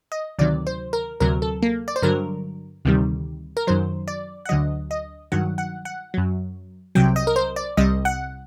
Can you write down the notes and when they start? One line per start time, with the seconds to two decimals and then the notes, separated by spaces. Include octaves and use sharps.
0.12 D#5
0.39 D2 C3 D#3 F#3 D5
0.67 C5
0.93 A#4
1.20 D2 C3 F#3 A#4
1.42 A4
1.62 A#3
1.88 D5
1.96 C5
2.02 G2 D3 F#3 A#4
2.85 D2 C3 D#3 G3
3.57 A#4
3.67 F#2 D#3 F#3 C5
4.08 D5
4.45 F#5
4.49 D2 D3 F#3 D#5
4.91 D#5
5.32 G2 D#3 F#3 F#5
5.58 F#5
5.85 F#5
6.14 F#2 F#3
6.95 C2 C3 F#3 G5
7.16 D#5
7.27 A#4
7.36 C5
7.56 D5
7.77 C2 C3 G3 D#5
8.05 F#5